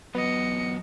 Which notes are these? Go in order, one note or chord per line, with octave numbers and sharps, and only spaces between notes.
E2 F#3 B3 D#5 C#7